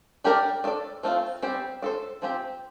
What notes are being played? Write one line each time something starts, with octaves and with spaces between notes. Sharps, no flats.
D4 G4 A#4 D5
D4 A4 D5
F3 A3 C4 F4
G3 C4 G4 C5
D4 A4 C5
F3 C4 G4